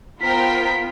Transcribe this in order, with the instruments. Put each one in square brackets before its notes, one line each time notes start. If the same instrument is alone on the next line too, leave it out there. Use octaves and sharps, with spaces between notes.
[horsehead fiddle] B3 F4 [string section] A#4 C5 G5 [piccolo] B6